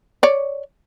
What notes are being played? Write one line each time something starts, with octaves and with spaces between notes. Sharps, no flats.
C#5 D5